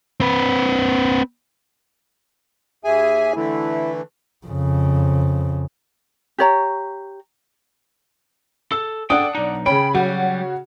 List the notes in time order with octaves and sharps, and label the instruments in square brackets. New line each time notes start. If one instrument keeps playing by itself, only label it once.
[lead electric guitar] C4 B4
[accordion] D#2 G#4 G#5 [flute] E5
[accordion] D3 E3 A3 [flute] E4
[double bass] F2 C#3
[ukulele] G4 C#5 A#5
[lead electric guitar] A4 [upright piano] E6
[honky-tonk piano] D4 [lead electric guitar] A4 G5 [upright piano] F#5 D#6
[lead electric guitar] B1 D#4
[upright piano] C#3 C#4 [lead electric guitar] G5 [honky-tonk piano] B5
[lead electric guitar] F#3 G3 [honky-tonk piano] F#4